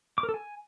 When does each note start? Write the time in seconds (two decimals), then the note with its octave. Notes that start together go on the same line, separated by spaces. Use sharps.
0.18 D6
0.23 A#4
0.29 A4
0.34 G#5